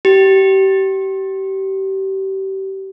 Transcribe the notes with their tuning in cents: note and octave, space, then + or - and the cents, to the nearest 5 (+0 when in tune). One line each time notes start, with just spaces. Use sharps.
G4 -30